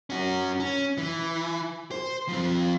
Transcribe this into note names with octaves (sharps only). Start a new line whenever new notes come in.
C#4 F#4
C#4
E3
C5
F3 C4